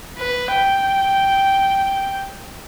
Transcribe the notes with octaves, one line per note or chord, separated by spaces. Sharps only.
B4
G5